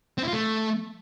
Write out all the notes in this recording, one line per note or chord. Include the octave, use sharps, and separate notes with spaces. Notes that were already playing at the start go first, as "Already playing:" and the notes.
C4
E4
F4
A3